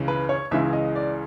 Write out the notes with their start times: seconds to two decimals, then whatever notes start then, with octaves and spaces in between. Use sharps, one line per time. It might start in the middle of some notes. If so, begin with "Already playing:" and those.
Already playing: C#2 C#3 E3 G#3
0.08 B4
0.29 C#5
0.51 C#2 C#3 E3 G#3 E5
0.73 D#5
0.96 D5